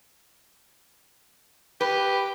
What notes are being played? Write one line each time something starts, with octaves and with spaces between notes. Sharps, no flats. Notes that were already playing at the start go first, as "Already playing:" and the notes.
G4 B4